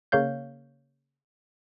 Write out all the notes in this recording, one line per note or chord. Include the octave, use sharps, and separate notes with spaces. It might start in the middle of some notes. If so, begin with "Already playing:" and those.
C#3 A#3 C#5 F5 G6